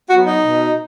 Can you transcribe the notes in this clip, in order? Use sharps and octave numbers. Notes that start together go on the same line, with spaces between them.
F#3 B3 F#4
D#4
B2